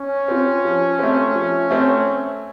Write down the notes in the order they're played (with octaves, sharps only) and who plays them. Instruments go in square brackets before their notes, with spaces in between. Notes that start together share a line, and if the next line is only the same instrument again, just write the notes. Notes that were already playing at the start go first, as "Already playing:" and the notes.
Already playing: [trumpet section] C#4
[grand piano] C4 F4
F3
A3 C4
F3
A3 C4